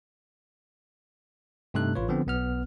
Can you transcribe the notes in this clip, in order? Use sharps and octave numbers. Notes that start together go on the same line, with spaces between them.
G2 C3 A3 D#4 A4 F#6
A1 F4 B4 C#5
D3 F3 B3 C4
B1 B3 F6